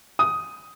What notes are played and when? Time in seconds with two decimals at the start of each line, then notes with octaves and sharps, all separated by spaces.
0.19 D#6